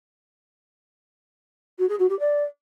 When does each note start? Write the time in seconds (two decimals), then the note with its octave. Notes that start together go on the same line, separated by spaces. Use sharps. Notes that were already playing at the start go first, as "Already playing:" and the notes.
1.79 F#4
1.89 G#4
1.99 F#4
2.09 G4
2.19 D5